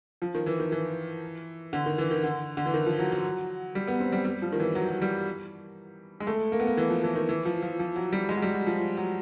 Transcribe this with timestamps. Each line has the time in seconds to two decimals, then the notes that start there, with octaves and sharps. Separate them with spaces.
0.22 F3
0.35 D#3
0.46 E3
0.60 D#3
0.72 E3
1.73 D3
1.86 D#3
1.98 E3
2.11 D#3
2.24 D3
2.57 D3
2.66 E3
2.74 D#3
2.86 F3
2.99 F#3
3.12 F#3
3.75 G3
3.87 B3
4.00 C4
4.12 G3
4.25 G3
4.42 F3
4.52 D#3
4.60 E3
4.75 F#3
4.89 F#3
5.02 G3
6.20 G#3
6.27 A3
6.52 A#3
6.60 B3
6.67 A#3
6.77 E3
6.90 F3
7.04 E3
7.15 D#3
7.29 E3
7.45 F3
7.62 F3
7.79 F3
7.96 F#3
8.12 G3
8.29 G#3
8.37 F#3
8.42 G3
8.54 F#3
8.67 F3
8.97 F#3